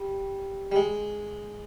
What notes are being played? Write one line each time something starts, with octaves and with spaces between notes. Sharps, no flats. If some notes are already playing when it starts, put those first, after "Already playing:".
Already playing: G3
G3
G#3